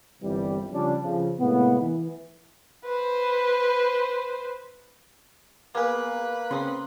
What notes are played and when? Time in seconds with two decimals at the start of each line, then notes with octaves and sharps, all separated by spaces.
0.22 G1 C2 C3 E3 G3
0.72 C#3 F3 G3 C#4 D4
1.02 F2 C#3 F3
1.40 A2 C3 G#3 A#3 B3
1.80 E3
2.84 B4 C5
5.75 A#3 B3 G#4 B4
6.51 C#3 C4 C#4 C6 D#6